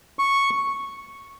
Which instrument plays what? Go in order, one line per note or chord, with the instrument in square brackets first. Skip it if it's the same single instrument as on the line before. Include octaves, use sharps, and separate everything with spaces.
[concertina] C#6